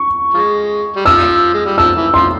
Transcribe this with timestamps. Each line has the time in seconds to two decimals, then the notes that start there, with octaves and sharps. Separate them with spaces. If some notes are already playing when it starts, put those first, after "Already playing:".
Already playing: C#6
0.34 F3 G#3
0.96 G3
1.05 F3 E6
1.54 G#3
1.65 G3
1.78 F3 E6
1.96 E3
2.14 F3 C6